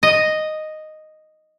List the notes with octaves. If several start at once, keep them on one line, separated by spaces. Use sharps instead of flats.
D#5